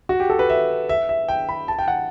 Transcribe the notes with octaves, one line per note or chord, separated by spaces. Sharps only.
F#4
G4
A4
B4
E5
E5
E5
G5
B5
A5
G5
F#5